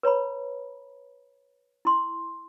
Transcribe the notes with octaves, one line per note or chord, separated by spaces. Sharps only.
B4 C#5 A#5 B5
E4 C6